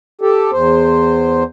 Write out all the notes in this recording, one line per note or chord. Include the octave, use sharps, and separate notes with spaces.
G4 A4
E2 C5